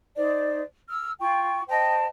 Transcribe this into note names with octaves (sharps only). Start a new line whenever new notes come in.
D#4 C5 D5
E6 F6
F4 G5 C#6
C5 D#5 G5 A5